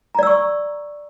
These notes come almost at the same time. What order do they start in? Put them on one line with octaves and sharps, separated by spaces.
A#5 D5 E6 C#6